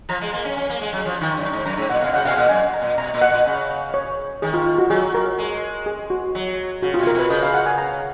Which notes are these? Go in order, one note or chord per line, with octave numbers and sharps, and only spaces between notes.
F3 A#5
G#3
A#3
C#4
C#4
A#3
G#3
F#3
F3
D#3
F#2
G#2 A#5
F#2 A#5
G#2 A#5
A#2 F#5
B2 F5
C#3 F#5
B2 F5
A#2 F#5
F#2 G#5
A#5
A#2
B2 A#5
A#2
F#5
A#2
C#3
C#5
D#3 G#4
F4
F4
F#4
F#3 G#4
A#4
G#3
G#4
F#4
F#3
C#3 F#4
F4
B2
A#4
B2 B4
C#3 D#5
F5
F#5
G#5
A#5